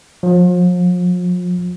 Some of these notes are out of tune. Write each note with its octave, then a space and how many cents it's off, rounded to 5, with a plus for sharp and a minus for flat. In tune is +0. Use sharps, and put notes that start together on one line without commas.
F3 +40